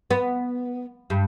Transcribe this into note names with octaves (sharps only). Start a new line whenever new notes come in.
B3
G2